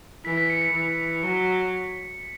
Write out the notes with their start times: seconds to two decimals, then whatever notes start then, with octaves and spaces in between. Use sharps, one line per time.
0.25 E3 B6
0.38 B6
0.50 C#7
0.61 B6
0.73 E3
1.23 F#3